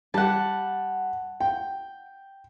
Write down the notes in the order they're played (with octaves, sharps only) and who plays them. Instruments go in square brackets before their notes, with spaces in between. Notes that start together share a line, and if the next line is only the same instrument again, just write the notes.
[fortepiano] G3 [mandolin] F#5 A5
[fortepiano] G5